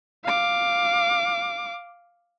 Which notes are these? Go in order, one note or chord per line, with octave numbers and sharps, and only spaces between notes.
F5 D6